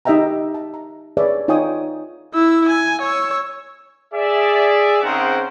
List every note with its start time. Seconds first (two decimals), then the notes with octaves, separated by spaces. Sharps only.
0.05 D#4 G4 D#5 E5 G5 A#5
0.54 A5
0.74 A#5
1.17 G#4 B4 C#5 D5 E5
1.48 D#4 F4 C#5 G5 G#5 D#6
2.34 E4 E6
2.69 G#5
3.01 C#5 E6
4.13 G#4 D5 E5
5.02 C#3 C4 D#4 A#4 C5 F#5